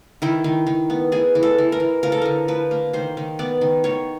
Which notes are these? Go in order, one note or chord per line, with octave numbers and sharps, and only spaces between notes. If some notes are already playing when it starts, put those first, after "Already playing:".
D#3 E4
D#3
D#3
B3
E3 G#4
E3
A4
E3
A#4
E3
F3 A#4
A4
D3 A#4
F3 B4
A#3
D#3 C5
D#3
B3 D5
D#3
D#3 C#5